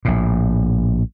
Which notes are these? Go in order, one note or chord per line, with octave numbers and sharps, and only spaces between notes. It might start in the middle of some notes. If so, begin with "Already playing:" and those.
A#1 A2